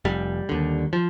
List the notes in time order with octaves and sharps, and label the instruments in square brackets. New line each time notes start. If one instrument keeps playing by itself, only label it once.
[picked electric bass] F1 G3
D#2 D3
F3